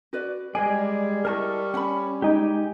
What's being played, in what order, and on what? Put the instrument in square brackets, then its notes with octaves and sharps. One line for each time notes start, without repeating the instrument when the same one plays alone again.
[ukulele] F#4 B4 D5
[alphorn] G3 [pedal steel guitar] G#3 G#4 D5 [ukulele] D#5 G#5
[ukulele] E4 C5 D#5 [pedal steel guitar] A#4 A5 C#6
[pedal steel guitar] C#4 [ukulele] F#5 B5
[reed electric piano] G#3 D#4 [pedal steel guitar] G4 G#5 D6